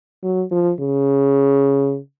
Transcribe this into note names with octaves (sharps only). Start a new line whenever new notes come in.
F#3
F3
C#3